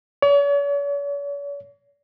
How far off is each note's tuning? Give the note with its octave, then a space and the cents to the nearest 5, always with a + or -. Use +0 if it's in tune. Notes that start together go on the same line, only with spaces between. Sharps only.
C#5 +45